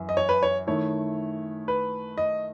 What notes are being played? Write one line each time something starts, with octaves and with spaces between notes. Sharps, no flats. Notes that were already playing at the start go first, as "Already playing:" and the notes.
Already playing: F#2 E3
D#5
C#5
B4
C#5
D#3 A3 E4 C#5
B4
D#5